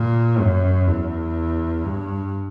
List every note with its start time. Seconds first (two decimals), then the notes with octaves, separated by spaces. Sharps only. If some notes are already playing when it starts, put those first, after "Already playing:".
Already playing: A#2
0.40 F#2
0.87 E2
1.84 G2